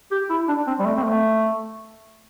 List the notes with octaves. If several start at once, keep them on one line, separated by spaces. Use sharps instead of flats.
G4
E4
D4
C4
G3
A3
C4
A3